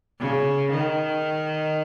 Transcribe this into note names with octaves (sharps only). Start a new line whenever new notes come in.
C#3
D#3